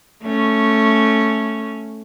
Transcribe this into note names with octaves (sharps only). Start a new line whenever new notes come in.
A3 C#4